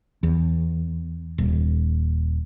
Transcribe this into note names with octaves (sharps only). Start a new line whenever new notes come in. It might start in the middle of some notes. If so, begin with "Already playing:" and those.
E2
D#1